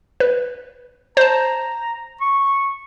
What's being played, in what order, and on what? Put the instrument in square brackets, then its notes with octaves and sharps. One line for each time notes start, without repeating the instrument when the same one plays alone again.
[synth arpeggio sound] B4
[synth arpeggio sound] C5 A5 [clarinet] A#5
[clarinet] C#6